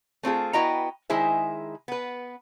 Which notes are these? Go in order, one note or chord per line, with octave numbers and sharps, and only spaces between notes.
A3 C4 F4 G#4
B3 E4 F#4 D#5 G5 A#5
D#3 G#3 E4 G#4 C5 E5
B3 B4